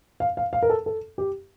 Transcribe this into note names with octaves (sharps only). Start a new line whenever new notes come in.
F5
F5
F5
A#4
A4
A4
G4